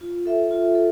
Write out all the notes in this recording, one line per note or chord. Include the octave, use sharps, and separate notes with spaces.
F4
A4 E5
F4
A4